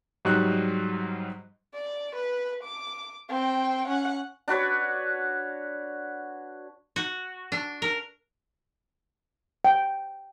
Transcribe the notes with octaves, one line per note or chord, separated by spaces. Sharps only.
G#2 F#3 G3 D#4 C#6 F#6
D5
B4
D6
C4 G5
C#4 F#5
D4 F#4 B4 C#5
F#4
D4
A#4
G5